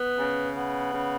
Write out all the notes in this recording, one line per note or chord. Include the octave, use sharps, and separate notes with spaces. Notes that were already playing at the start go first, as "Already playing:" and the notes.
Already playing: B3
C#3
B3
C#3